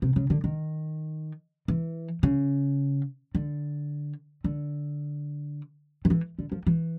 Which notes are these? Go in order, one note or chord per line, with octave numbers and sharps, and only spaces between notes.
C3
C#3
D3
D#3
E3
C#3
D3
D3
D#3
E3
D3
F3
E3